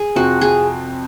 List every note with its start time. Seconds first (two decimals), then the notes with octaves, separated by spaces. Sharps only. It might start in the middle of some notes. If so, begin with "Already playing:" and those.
Already playing: G#4
0.16 F2 C3 F3 C4 F#4
0.41 G#4